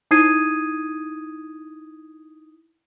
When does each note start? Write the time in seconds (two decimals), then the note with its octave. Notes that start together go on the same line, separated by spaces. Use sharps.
0.11 D#4 E4 D#6 G#6 C7 D#7